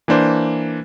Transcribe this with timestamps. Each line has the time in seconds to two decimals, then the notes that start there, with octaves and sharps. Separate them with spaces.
0.08 E3 A#3 D4 C5